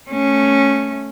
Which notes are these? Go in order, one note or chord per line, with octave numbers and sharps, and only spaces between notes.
A3 C#4